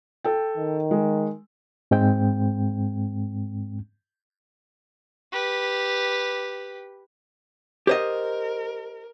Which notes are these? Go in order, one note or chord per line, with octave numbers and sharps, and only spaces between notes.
A4 G5
D#3
G#3
G#2 G#3 C4 G5
G4 B4
G4 A#4 C5 D#5